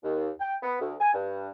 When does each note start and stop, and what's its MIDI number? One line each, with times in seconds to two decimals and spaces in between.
0.03 0.29 39
0.40 0.54 79
0.63 0.77 59
0.81 0.94 38
1.00 1.10 80
1.14 1.49 43